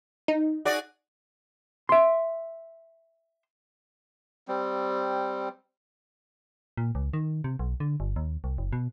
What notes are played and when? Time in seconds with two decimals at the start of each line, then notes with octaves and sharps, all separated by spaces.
0.28 D#4
0.65 F#4 G#4 D5
1.89 E5 C6
4.48 G3 C4
6.77 A#2
6.95 C#2
7.13 D#3
7.44 C3
7.59 B1
7.80 D3
8.00 G1
8.16 D#2
8.44 C2
8.58 F#1
8.73 B2